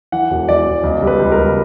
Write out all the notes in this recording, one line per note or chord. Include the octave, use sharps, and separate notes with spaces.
E3 F#5
E1
E3 D5
E1
C#2
G3
B4
C#2
A#4
C#2